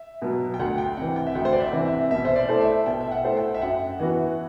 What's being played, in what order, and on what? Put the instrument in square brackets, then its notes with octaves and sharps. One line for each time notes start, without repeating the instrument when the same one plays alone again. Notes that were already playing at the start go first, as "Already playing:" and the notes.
Already playing: [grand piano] E5
[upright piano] B2 F#3
[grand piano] G5
[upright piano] D2 [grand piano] F#5
[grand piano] G5
[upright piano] C3 E3 [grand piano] F#5
[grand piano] G5
E5
[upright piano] D2 [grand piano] F#5
[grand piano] C5
D5
E5
[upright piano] C3 E3
[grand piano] E5
[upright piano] B2 [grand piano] E5
[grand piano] C5
D5
[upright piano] A3 E4 A4 C5
[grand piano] E5
[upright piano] B2 [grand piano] G5
[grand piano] E5
F#5
[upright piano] A3 E4 A4 C5
[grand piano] G5
E5
[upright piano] F#2 [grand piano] F#5
[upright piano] E3 B3 F#4